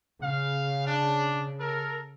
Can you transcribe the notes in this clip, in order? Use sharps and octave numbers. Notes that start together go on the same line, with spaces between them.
C#3 F5
D4
A4 A#4